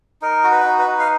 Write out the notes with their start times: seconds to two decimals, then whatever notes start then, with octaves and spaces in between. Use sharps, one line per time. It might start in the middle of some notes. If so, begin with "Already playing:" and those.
0.22 D#4 A#4
0.44 F#4
0.51 B4
0.65 D#4
0.79 B4
0.87 D#4
1.00 F5